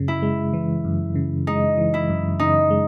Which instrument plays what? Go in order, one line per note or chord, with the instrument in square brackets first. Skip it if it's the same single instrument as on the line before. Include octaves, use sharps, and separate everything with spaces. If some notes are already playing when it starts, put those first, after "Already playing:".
Already playing: [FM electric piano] F#2 C#3
[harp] E4
[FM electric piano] G#3
E3
F#2
C#3
[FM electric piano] G#3 [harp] D#4
[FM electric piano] E3
[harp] E4
[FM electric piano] F#2
[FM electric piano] C#3 [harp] D#4
[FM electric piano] G#3